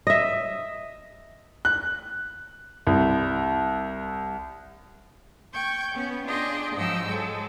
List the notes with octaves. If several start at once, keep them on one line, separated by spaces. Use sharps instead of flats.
D#5 E5
F#6
C2
G5 C#6 G6 G#6
B3 C#4
D4 F4 G#4 D#5 G5 C6
G#2 F3 F#3 D#5 G5 E6
F#3 G#3 A4